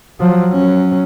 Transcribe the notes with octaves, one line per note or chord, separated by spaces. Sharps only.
F3 F#3
F#3 C#4